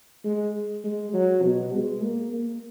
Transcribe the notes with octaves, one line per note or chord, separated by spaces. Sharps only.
G#3
G#3
F#3
B2
G#3
A#3
A#3